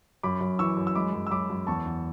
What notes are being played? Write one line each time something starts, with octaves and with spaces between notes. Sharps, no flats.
F#2 B5 D6
F#2
E3 C#6 E6
F#2
E6
G#3 B5 D6
F#2
E6
F#2 B5 D6
F#2
E2 A5 C#6
E2